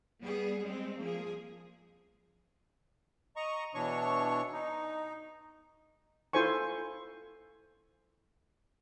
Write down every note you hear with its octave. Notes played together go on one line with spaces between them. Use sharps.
G3 B3 G#4
G3 G#3 C4
F3 A#3 G#4
D#5 A#5 C#6
B2 E3 D4 C#5 C#6
D#4
E4 F4 A4 C5 G#5 C#6